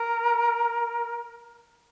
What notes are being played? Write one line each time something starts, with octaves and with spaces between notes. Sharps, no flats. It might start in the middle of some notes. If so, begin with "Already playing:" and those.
Already playing: A#4